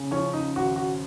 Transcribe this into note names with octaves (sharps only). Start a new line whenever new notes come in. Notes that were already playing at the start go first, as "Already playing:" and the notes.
Already playing: C#3
F3 C#4
D#4
G#1 F#4
F#4